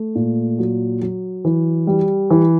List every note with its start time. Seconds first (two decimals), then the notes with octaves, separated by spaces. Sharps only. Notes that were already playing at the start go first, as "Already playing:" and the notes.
Already playing: A3
0.15 A#2
0.59 F#3
1.02 F#3
1.45 E3
1.87 G3
2.30 E3